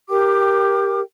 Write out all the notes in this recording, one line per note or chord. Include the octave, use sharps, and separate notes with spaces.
G4 A#4 G5 D6